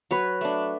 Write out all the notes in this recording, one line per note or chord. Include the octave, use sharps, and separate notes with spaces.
F#3 B4 C#5
A3 D4